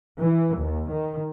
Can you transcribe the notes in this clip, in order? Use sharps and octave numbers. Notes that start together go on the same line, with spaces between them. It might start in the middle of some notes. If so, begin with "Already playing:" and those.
E3
D#2
D#3